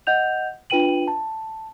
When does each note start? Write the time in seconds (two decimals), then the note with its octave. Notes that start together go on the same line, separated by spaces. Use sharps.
0.07 D#5 F#5 G6 F7
0.70 D4 F4 B4 G5 D#7 F#7
1.08 A5